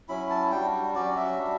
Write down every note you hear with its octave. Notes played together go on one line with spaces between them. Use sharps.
F#3 C#4 E4 B5
A5
G3 D4 F#4 G5
F#3 C#4 F#4 D5
E5
G3 D4 F#4